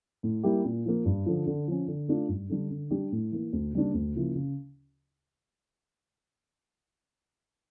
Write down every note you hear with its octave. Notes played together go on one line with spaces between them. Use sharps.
A2
G3 A#3 E4 G4
A#2
F3 A#3
G2
D3 F3
D3
F3 C#4
D3
A3 D4 F4
G2
D3 G3 D4
D3
G3 D4 G4
A2
E3 A#3
D2
C#3 G3 A#3 D4
D2
C#3 F3 A#3 E4
C#3